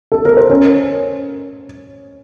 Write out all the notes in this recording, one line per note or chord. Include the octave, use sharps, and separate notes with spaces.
A4
A#4
C5
C#4 C#5